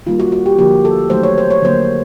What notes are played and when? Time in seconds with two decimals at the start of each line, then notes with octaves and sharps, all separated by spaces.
0.06 D#3 G3 A#3 F4
0.19 F#4
0.32 F#4
0.46 G4
0.59 D3 F3 A#3 G4
0.85 A4
1.10 D#3 F#3 A3 C5
1.23 C#5
1.38 C5
1.50 C#5
1.62 D3 F#3 A#3 C5